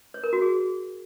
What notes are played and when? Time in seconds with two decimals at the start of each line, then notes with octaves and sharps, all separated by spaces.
0.14 C#5
0.24 A#4
0.33 F#4
0.42 G#4